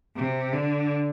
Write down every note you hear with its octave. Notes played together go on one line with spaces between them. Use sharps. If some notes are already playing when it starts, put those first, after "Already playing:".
C3
D3